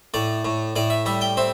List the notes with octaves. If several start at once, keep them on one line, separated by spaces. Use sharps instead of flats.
A2 D5
A2
A2 D5
E5
G3 E5
G5
C4 E5